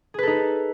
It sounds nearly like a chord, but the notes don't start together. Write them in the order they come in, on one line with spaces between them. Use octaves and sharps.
G#4 B4 A4 D#4